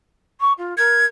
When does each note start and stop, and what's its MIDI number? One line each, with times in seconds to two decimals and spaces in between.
0.40 0.52 85
0.57 0.76 65
0.77 1.05 70
0.77 1.06 92